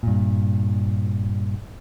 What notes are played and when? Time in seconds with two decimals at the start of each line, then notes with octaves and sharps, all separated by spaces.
0.03 G2 A#2